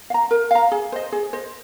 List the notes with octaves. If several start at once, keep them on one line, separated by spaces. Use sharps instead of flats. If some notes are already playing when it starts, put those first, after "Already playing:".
F5
A#5
A#4
F5 A#5
G#4
C5 D#5
G#4
C5 D#5